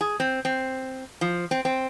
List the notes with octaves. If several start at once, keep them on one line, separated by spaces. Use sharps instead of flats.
G#4
C4
C4
F3
C4
C4